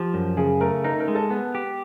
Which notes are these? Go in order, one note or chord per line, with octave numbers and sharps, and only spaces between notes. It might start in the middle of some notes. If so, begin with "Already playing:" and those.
Already playing: F3 G4
F#2
C#3 G#4
A3 A#4
D#4 A#4
A#4
G#3
A4
B3
G4